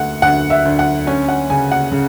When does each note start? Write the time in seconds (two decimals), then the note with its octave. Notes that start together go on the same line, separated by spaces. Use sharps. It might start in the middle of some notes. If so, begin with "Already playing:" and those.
Already playing: D2 A3 F#5
0.22 D2 F#5
0.50 E5
0.65 D2
0.79 F#5
1.07 C#4 G#5
1.29 F#5
1.50 C#3 G#5
1.72 F#5
1.92 C#3